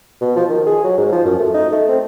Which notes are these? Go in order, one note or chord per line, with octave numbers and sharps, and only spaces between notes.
B2
F3
D#3
G#4
F#3
G#2
F3
F#2
A3
D#4
A3
C4